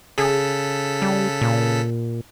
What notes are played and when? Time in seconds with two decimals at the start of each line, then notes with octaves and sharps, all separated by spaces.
0.18 C#3 G#4 A4 B6
1.02 G3
1.42 A#2